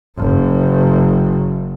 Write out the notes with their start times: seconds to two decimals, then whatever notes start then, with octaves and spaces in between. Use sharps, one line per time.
0.17 F#1 F#2